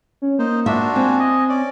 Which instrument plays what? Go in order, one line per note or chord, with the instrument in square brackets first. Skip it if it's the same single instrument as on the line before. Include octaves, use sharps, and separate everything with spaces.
[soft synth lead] C#4
[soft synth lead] A#3 [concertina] D#4 C5
[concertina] D4 F4 F#4 [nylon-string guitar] E5
[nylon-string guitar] C4 [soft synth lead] G#5
[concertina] D#5
C#4 D5